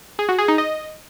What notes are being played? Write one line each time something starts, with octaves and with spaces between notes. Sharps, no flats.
G#4
F#4
G#4
D#4
D#5